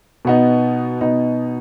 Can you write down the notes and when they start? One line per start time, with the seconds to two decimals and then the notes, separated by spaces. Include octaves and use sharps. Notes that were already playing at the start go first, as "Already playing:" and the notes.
0.25 B2 B3 D#4
1.01 B2 B3 D#4